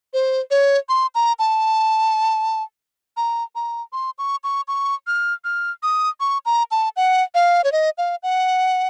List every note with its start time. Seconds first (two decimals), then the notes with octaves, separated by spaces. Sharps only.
0.14 C5
0.51 C#5
0.89 C6
1.15 A#5
1.39 A5
3.17 A#5
3.55 A#5
3.93 C6
4.18 C#6
4.44 C#6
4.68 C#6
5.07 F6
5.44 F6
5.83 D#6
6.20 C#6
6.46 A#5
6.71 A5
6.96 F#5
7.35 F5
7.64 C#5
7.72 D#5
7.98 F5
8.23 F#5